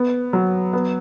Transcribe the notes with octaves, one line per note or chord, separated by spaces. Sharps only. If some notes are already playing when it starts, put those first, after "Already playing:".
Already playing: B3
F#3
B3